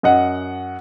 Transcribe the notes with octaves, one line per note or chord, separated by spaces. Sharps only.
F#2 D#5 F#5